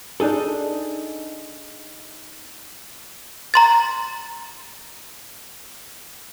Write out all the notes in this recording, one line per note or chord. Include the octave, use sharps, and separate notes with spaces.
D4 D#4 G#4 A4
A#5 C6 A6